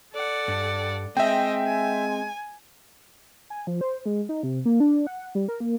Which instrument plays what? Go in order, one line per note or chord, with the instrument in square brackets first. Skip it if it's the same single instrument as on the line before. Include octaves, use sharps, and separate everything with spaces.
[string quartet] A4 D5 F#5
[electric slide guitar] G2
[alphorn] G#3 [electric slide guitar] C4 [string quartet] D#5 [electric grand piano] E5 G5
[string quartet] G#5
[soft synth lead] G#5
F3
C5
G#3
D#4
C3
A#3
D4
F#5
G3
A#4
A#3